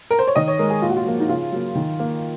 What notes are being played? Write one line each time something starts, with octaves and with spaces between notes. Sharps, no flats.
A#4
C5
C#5
D#3 D#5
C#5
G#3 A#4
G#4
A#2 F4
F#4
F4
F3 A#3
D#4
C#3 F4
F#3 A#3
D#3
A#3